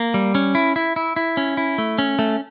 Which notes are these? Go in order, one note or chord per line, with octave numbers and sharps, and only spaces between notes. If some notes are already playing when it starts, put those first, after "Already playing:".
Already playing: A#3
G3
C#4
E4
E4
E4
E4
C#4
E4
A3
C#4
A3